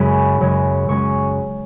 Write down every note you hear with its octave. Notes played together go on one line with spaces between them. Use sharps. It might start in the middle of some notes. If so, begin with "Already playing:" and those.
Already playing: F#2 C#3 G#3 C#4 B5
F#2 C#3 G#3 C#4
F#2 C#3 G#3 C#4 C#6